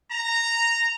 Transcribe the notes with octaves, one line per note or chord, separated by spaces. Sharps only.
A#5